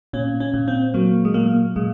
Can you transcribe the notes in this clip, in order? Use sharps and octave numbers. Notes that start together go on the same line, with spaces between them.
A#2 C#4
C#4
A#2
C4
F#3 A#3
G#3
A#2 A#3
A#2 G#3